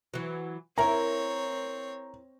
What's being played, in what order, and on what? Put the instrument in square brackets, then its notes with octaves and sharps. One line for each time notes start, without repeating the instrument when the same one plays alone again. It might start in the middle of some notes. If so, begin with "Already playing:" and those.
[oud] E3 F#3
[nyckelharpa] C4 C#5 [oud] E4 A#4 [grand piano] A#5